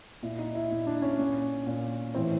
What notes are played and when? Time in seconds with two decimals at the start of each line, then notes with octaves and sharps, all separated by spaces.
0.23 A#2 E4
0.38 D#4
0.55 E4
0.70 A#2 E4
0.87 D4
1.02 C#4
1.19 A#2
1.67 A#2
2.14 A2 E3 C4